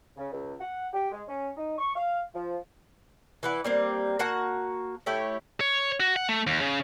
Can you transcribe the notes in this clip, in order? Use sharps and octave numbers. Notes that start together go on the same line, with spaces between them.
C#3
C#2
F#5
G4
G#3
C#4
D#4
C#6
F5
F3
E3 B4 F#5
G3 A#3 C4
A#3 F#4 F#5 A5
A3 E4 G4 C#5
C#5
F#4
F#5
A3
D#2
C#3